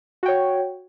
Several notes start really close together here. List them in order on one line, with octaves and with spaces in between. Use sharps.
F#4 G5 C#5